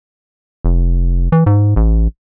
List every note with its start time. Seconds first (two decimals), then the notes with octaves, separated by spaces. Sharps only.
0.65 F1
1.32 E3
1.46 G#2
1.76 A1